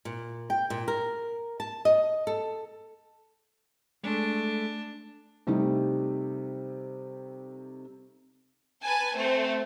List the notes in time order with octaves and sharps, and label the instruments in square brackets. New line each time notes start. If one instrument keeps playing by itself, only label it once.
[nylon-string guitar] A#2
G5
A#2
A#4
A5
D#5
A4
[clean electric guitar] G#3 A3 [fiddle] D4
[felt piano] C3 G3 A3 D#4
[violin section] B4 G#5 A5
A3 C4 C5